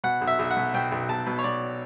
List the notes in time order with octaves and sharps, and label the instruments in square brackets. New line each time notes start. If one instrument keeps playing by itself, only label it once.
[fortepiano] B2 F#5
B1
E5
B1
F#5
B2
B2 G5
B1
B1 A5
B2
C#5
B2 D5